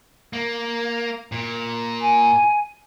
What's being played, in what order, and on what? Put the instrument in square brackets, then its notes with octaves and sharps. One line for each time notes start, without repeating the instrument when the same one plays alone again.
[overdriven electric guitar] A#3
A#2
[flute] G#5